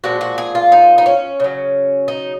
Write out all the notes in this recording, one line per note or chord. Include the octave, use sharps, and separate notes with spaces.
A#2 F3 G#3 F#4
F#4
G#4
F4
D#4
D#4
C#4
C#3 F#3
D#4